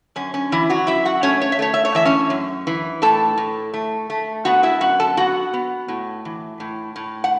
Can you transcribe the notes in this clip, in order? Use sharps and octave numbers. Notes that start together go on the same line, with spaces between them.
F#2 C#4
C#4
F#2 E3 E4
F#3 F#4
F#2 E4 E5
F#4 F#5
A3 C#4 C#5
C#5
E5
A3 C#5
E5
C#5
E3 E5
C#4 C#5
F#2
E3
A2 A4 A5
A2
A3
A3
B3 F#4 F#5
E4 E5
F#2 F#4 F#5
A4 A5
B3 F#4 F#5
B3
A2
E3
A2
A2
F#5